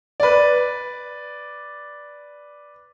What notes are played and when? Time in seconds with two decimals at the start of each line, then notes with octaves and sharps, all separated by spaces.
0.20 B4 D5